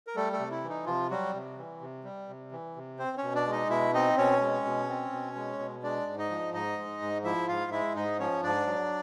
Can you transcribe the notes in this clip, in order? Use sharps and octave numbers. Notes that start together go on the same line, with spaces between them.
A#4
G3 A3 A4
A3 A4
C3
E4
E3
D#4
C3 F3 F4
F#3 G3 F#4
C3
E3
C3
G3
C3
E3
C3
C4 C5
C#4 C#5
B2
D4 D5
G#3
D#4 D#5
B2 E4 E5
C4 D#4 D#5
B2 C#4 C#5
G#3
B2
C4
B2
G#3
B2
G#3 D4 D5
G#2
D#4 D#5
F3
G#2 D#4 D#5
G#3
G#2
F3 E4 E5
G#2 F4 F5
G#3 E4 E5
G#2 D#4 D#5
F3 C#4 C#5
G#2 D4 D5
F#3